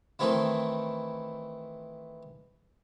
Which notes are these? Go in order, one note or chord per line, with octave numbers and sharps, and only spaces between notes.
D#3 E3 A3 C4 D#4 E4